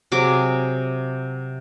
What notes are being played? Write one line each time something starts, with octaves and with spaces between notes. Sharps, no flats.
C3 F#3 G#4 D6